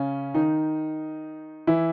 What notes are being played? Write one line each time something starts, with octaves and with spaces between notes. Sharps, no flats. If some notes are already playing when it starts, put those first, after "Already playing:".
Already playing: C#3 C#4
D#3 D#4
E3 E4